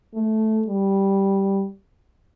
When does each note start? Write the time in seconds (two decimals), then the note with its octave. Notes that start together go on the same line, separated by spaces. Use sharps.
0.14 A3
0.67 G3